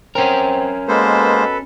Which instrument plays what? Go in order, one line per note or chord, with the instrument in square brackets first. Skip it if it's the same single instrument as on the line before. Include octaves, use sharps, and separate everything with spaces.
[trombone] C4 [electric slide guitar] C#4 A#4
[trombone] B2 [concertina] G#3 A#3 C5 [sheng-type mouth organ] A4 B4